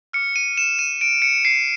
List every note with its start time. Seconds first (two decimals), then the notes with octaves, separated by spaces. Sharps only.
0.13 D6 F6 C#7
0.36 D#7
0.58 E7
0.79 D#7
1.01 D7
1.22 C#7
1.45 C7